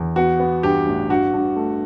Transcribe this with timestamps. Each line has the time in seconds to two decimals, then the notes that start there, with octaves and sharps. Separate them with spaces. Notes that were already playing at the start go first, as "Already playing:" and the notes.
Already playing: E2
0.16 B3 F#4
0.40 B3
0.63 G2 G4
0.86 A1
1.10 G2 F#4
1.34 G2
1.56 A3